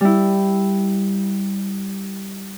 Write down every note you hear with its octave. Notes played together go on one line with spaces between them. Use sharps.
G3 E4